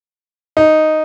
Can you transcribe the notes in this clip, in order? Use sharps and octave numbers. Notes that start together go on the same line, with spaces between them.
D#4